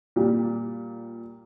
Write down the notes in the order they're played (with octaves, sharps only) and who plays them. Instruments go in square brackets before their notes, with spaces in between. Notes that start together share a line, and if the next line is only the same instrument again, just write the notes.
[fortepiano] A#2 G3